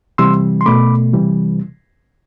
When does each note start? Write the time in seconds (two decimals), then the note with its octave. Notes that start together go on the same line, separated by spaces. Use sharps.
0.18 C3 E3 G3 C6 E6
0.61 C6
0.66 B2 A3 B5 D6
1.13 C3 E3 G3